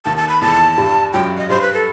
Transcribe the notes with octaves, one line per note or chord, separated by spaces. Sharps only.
D#2 D#3 A5
A5
B5
E2 E3 A5
G2 G3
F#2 F#3 G5
D#5
G2 G3 C5
B4
A4